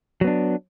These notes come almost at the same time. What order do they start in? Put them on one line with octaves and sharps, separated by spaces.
F#3 B3 D4